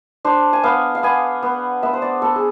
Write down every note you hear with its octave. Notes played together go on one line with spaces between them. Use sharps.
D4 C5
G#5
B3 F5
F5
B3 G#5
B3
B3 E5
C5
D5
B3 A4
G#4